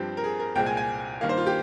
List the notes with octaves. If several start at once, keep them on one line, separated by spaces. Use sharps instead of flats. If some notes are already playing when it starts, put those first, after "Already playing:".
Already playing: G2 F3 C4 G4
A#4
G#4
A#4
C2 A#2 G#3 C4 G5
G#5
G#5
G2 D#3 A#3 F5
C5
F4
G4